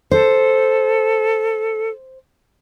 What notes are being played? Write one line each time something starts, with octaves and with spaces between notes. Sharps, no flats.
A4 C5